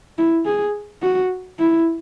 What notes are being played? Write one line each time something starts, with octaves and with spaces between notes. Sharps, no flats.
E4
G#4
F#4
E4